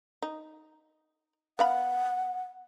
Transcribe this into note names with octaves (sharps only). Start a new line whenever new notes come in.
D#4
B3 F5 F#5 B5